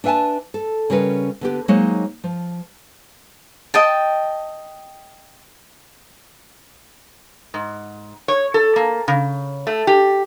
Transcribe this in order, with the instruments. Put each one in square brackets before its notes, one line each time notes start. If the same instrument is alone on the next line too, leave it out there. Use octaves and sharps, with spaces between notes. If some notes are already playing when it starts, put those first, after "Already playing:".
[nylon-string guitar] D4 B4 E5 F#5 G#5 A5
A4
C#3 G3 C#4 A#4 B4
D3 B3 G4
F#3 G#3 A#3 D#4 C5 C#5
F3
[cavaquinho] D#5 G5 A5
[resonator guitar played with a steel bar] G#2
C#5
A4
A#3
C#3
A3
G4